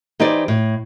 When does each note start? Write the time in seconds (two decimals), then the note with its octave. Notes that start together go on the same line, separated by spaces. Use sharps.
0.20 E3 D#4 G4 C5 D5
0.48 A2